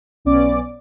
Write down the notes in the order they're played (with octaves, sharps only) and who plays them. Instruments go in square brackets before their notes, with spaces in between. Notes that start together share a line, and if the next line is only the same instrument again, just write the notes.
[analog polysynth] B1 B3 C#4 D5 D6